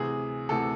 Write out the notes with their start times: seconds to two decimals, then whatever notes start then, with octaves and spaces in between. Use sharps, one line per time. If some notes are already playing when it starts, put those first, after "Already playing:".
Already playing: D2 C3 E3 G#4
0.49 D2 C3 E3 A4